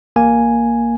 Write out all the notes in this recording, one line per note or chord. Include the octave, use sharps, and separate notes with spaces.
A1 A#3 G#5